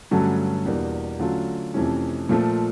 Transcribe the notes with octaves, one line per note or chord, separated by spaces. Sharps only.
G2 D3 F#3 A3 C#4
E2 B2 G3 A#3 D4
D3 F#3 A3 C#4 F4
F2 C3 E3 A3 C#4
A#2 F3 A3